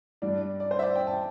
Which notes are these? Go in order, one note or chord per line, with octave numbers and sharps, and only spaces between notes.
G2 G3 D4 D5
D5
C5
E5
D5
G5
A5